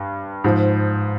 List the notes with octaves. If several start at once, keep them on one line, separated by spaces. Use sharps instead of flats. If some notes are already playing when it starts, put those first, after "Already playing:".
Already playing: G2
G#2 F3